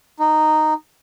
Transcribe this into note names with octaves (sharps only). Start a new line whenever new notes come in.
D#4